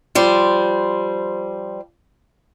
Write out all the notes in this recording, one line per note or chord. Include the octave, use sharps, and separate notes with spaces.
F3 G3 C5